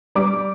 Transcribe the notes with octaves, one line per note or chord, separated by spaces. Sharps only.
G3 D6